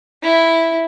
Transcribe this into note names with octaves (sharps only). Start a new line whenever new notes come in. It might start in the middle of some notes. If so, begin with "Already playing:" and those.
E4